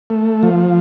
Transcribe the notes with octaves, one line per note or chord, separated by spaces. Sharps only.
A3
F3